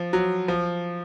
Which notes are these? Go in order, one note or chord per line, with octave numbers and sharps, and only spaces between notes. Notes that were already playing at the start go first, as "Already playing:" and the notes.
Already playing: F3
F#3
F3